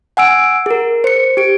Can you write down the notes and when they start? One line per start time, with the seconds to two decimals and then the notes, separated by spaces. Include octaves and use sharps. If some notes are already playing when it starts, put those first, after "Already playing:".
0.17 F#5 G#5 E6 D7
0.66 G#4 A#4
1.04 C5 C#7
1.37 G4 D7